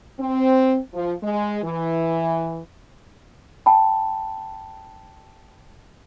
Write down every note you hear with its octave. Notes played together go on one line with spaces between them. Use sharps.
C4
F3
G#3
E3
G5 A5 B5